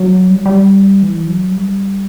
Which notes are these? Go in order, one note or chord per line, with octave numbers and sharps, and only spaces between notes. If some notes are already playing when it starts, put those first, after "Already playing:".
Already playing: F#3
G3
F#3
G3
E3
F#3
G3